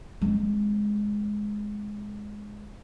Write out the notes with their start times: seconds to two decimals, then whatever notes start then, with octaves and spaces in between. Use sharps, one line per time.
0.22 G#3 C4